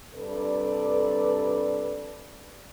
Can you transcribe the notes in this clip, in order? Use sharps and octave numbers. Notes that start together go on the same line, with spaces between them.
G2 C3 A4 B4 D5